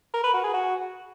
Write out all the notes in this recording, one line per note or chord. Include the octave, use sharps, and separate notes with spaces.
A#4
B4
F#4
G#4
F#4